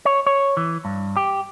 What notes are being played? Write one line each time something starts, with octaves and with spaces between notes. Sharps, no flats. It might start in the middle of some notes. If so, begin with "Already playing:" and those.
C#5
C#5
E3
G2
G4